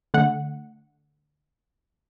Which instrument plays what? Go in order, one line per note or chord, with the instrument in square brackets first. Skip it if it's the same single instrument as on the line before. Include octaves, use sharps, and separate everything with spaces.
[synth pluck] D3 A3 F#5